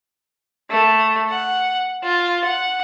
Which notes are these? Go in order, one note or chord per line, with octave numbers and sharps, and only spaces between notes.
A3
F#5
F4
F#5